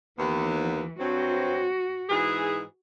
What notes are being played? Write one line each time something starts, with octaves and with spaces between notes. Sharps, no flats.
D#2 E3 B3
G2 F#3 C4 F#4
G#2 E3 G#4